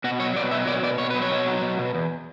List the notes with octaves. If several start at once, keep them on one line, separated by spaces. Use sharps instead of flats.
B2 F#4
F#3 C#5
B2 D5
F#3 E5
B2 D5
B2 D5
B2 C#5
F#3 B4
C#5
B2
F#3
B2
B2
E2